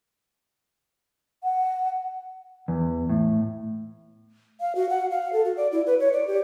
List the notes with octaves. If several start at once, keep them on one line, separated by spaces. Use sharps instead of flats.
F#5
E2
A2
F5
F#4
F#5
F5
A4
F#4
D5
E4
B4
C#5
D5
G4